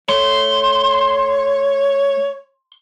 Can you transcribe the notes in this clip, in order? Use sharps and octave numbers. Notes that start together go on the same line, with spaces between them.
A3 C#5 C6